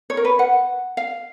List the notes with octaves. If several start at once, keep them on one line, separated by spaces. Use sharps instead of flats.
C#5
A#4
B4
F#5
F5